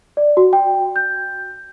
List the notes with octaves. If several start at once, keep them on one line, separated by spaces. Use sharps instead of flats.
D5
F#4
G5
G6